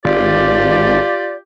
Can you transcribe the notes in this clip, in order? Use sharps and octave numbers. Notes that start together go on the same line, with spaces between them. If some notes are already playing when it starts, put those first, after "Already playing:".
G#1 F4 G4 D5